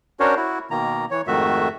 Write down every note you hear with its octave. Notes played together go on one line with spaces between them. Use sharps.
C#4 D4 F#4 A#4 C5 C#5
E4 F#4
B2 D#3 A#3 A#5
E3 C#5
F2 G#2 D#3 A3 F#4 E5